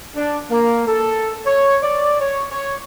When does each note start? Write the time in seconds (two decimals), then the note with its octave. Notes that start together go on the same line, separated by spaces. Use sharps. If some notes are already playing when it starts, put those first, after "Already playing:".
0.16 D4
0.51 A#3
0.87 A4
1.46 C#5
1.83 D5
2.21 C#5
2.51 C#5